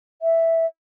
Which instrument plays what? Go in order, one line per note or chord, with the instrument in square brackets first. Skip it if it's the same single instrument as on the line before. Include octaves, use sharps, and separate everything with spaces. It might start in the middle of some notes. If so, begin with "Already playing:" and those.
[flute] E5